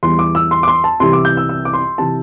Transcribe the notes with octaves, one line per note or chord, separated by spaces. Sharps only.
E2 E3 G3 C6
D6
E6
C6
D6
C6
A5
C2 C3 E3 G3 C6
D6
G6
E6
E6
D6
C6
C3 E3 A5